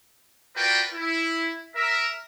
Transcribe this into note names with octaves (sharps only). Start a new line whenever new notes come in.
F4 F#4 A#4 B4 D5 G5
E4
A#4 E5